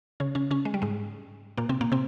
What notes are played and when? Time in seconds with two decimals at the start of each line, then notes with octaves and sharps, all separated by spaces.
0.20 C#3 C#4
0.35 C#3 C#4
0.51 C#3 C#4
0.65 G#3
0.74 G3
0.82 G#2 G#3
1.57 A#2 A#3
1.69 C3 C4
1.81 A#2 A#3
1.92 C3 C4